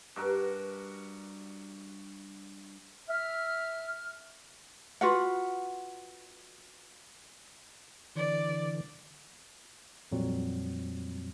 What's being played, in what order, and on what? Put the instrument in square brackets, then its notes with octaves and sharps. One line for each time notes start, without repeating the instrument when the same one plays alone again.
[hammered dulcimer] G2 F#4 A#4
[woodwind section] E5 F6
[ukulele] F4 F#4 B4 F#5
[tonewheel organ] D3 E3 [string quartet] D5
[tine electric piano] F2 A#2 F#3 G3 C4